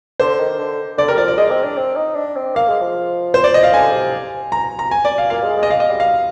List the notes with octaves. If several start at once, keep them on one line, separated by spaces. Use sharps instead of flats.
D3 C5
D#3
D3
D3 D5
G3 A#4
F3 D5
D5
G#3 D#5
C4
D4
C4
D#4
D4
C4
A#3 F5
G#3
F3
C5
D5
D#5
F5
D3 G#5
C3
A#5
A#5
G#5
D5
F5
A#2 F5
G#3
G#3
D#5
F5
D#5
G3
F5